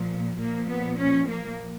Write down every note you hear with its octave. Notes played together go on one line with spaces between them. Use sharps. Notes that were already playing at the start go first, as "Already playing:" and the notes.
Already playing: A#2 F3
A#2 F3 A#3
B3
C#4
A#3